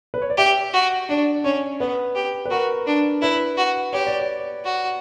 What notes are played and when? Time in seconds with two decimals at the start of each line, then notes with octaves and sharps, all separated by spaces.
0.14 B4
0.22 C#5
0.30 D5
0.37 G4 E5
0.73 F#4
1.09 D4 D5
1.44 C#4 C#5
1.80 B3 B4
2.16 G4
2.45 B4
2.51 F#4 A#4
2.87 D4
3.22 E4 B4
3.57 F#4
3.93 G4 C#5
4.07 D5
4.19 C#5
4.65 F#4